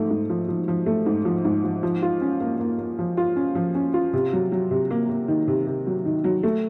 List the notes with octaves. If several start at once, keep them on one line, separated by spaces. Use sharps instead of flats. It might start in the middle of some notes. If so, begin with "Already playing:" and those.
Already playing: G#2 F3 A3
G#2
F3
F3
F3
A3
G#2
F3
G#2
F3
F3
F4
C#4
A#3
A#3
A#3
F3
F4
C#4
F3
C#4
F4
C3
F#3
F#3
C3
A#3
A#3
D#3
C3
C3
F#3
D#3
F#3
A3